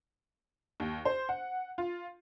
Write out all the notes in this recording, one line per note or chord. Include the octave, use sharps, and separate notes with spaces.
D#2
C5
F#5
F4